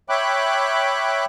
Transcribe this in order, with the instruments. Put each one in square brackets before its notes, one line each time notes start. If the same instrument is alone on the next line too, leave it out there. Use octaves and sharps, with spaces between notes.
[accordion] C#5 E5 G5 B5 D6 F#6